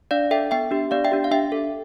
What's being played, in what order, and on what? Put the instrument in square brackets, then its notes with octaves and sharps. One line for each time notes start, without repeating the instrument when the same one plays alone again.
[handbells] D4 D5 F5
A4 E5 G5
B3 E5 G5
D4 G4
B3 D5 F5
E5 G5
D4 G4
F5
D4 E5 G5
A4